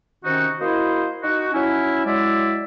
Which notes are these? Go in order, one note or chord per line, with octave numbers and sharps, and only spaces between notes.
C3 D#3 C#4 D#4 F#4
A#3 E4 F#4 C5 D#5
D#4 F#4
F#3 C#4 E4
F#3 G#3 E4 D5 E5